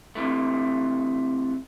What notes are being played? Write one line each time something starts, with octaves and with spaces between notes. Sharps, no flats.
C3 E3 A3